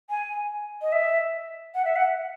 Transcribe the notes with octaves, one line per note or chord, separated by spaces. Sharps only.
G#5
D#5
E5
F#5
E5
F#5